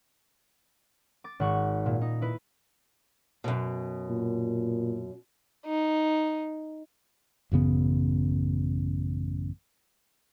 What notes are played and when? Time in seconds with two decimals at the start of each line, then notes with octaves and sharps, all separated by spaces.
1.24 D6 A6
1.40 G#1 F#5 C#6
1.86 A#2
2.01 D#4
2.21 E4 B4
3.44 F#2 B2
4.10 A#2
5.66 D#4
7.52 A1 F#2 C#3 B3